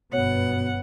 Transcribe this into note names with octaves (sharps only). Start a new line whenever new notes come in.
G1 F#2 B2 B3 C#5 F#5